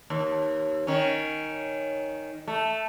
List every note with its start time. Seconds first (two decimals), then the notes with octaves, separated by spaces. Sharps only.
0.10 D#2
0.87 D#3 C#4
2.48 A3